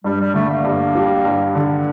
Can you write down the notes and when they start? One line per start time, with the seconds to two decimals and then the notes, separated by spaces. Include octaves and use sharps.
0.04 G2 G3
0.20 G3
0.34 D3 A3
0.49 A#3
0.64 G2
0.95 G3
1.25 G2
1.55 D3